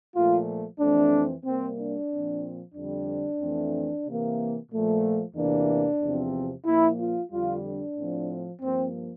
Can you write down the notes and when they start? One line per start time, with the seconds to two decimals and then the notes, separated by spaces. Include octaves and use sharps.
0.15 A#2 F3 A3 F4
0.80 F2 E3 A3 C4 D4
1.45 C3 G3 A#3 C4
1.78 D4
2.11 A#2 F3 C4
2.75 F2 D3 G3 C4 D4
3.40 F2 E3 A3 C4
4.06 C3 E3 A#3
4.71 A#2 F3 A3
5.35 E2 C3 E3 A#3 D4
6.02 E2 C3 F3 C4
6.66 A#2 F3 A#3 E4
6.99 F4
7.32 F2 D3 G3 F4
7.64 D4
7.96 A2 F3 C4
8.61 G2 F3 A#3 C4